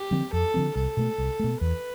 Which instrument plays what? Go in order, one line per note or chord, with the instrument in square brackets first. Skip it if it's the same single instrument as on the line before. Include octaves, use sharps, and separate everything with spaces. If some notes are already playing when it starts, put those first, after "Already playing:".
Already playing: [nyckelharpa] G4
[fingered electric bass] D3 F3 C4
[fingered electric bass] F2 [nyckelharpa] A4
[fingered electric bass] D3 F3 C4
[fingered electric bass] C2 [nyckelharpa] A4
[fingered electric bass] B2 A3
C2
B2 A3
[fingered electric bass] E2 [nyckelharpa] B4